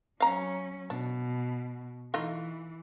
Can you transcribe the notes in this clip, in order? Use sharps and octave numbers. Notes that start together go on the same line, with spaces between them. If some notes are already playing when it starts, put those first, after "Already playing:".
F#3 C#4 F5 A#5
B2 D4
E3 A3 D#4 F4